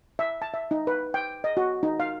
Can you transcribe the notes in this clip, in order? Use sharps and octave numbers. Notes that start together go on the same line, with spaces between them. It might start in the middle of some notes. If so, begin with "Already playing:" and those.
E5
A5
E5
D#4
B4
G5
D#5
F#4
D#4
F5